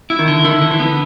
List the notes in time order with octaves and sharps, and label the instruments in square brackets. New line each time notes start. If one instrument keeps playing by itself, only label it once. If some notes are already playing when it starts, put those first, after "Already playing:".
[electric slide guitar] E4
[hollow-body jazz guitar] D#3
[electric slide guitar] D3
[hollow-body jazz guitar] D#3 [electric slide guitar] E4
[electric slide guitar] D3
[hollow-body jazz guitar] E3
[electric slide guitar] B3